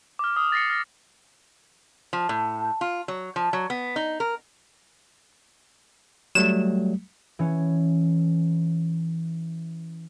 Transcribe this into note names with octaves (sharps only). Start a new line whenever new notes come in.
D6 F6
D#6
A6 A#6 C7 C#7
F6 A#6
F3
A2
F4
F#3
F3
F#3
B3
D#4
A#4
F#3 G3 A3 E7
E3 C#4